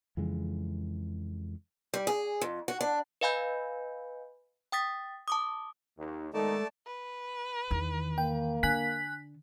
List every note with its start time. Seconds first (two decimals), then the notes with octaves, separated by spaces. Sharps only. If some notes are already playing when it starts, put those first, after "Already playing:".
0.17 F2 C#3 E3 G#3
1.94 G3
2.07 G#4
2.41 F2
2.68 F#4
2.81 D4
3.21 B4 D#5 F5 G#5 B5 G6
4.72 G5 D#6 A6 B6
5.28 A5 D6 D#6
5.98 D#2 D#4
6.34 D#3 G#3 A3 B3 D#4 A4 D5 A5
6.87 B4
7.71 E2 D#3
8.18 A#3 G5
8.63 D3 G#5 F#6 B6